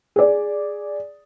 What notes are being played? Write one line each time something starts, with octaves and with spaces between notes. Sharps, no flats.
G#4 D5